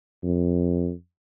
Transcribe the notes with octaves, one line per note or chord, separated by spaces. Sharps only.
F2